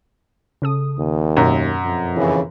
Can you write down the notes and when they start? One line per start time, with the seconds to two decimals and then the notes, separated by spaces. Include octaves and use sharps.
0.62 C#3 A4 D#6
0.98 D#2
1.37 F#2 B2
1.85 F2
2.16 D#2 C#3 E3